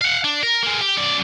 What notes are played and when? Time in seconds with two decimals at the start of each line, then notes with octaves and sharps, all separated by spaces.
0.01 F5 F#5
0.24 D4
0.43 A#4
0.63 G#3 A#3
0.81 G4
0.97 F#2 D5